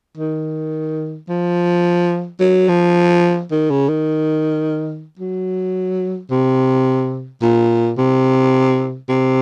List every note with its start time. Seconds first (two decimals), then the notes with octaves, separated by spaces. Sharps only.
0.18 D#3
1.29 F3
2.40 F#3
2.68 F3
3.52 D#3
3.71 C#3
3.89 D#3
5.19 F#3
6.31 C3
7.42 A#2
7.98 C3
9.09 C3